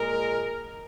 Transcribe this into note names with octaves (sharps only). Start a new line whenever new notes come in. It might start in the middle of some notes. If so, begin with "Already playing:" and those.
Already playing: A#2 G#3 A#4